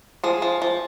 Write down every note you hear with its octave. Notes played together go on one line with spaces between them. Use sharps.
F3 G#4
F3
F3